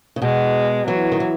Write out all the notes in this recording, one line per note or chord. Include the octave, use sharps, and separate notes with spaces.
C#3
B2 G#3
E3 F#3
D#3
E3